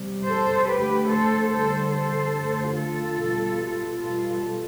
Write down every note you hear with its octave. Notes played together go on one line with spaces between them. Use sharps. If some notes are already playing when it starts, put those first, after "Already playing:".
Already playing: C3 G3
A4 C5
D3 A3 G4 B4
A4 C5
D3 G3 A4 C5
A4 C5
D3 A3
F4 A4
B2 G3
B2 G3 F4 A4